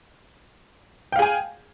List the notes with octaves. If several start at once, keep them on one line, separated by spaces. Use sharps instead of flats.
G#4 F5 G5 G#5